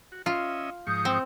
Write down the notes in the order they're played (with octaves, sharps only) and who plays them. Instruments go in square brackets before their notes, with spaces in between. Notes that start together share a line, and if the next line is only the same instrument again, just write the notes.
[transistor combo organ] F#4
[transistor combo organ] C#4 D#5 E5 [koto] F4
[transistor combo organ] G#2 F3 C#6 [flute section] D#6 G6
[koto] C4